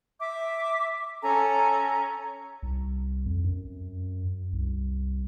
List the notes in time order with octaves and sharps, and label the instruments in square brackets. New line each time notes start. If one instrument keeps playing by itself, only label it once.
[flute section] E5 D6
C#4 A4 G#5 A#5
[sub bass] C2
F2
F#2
C2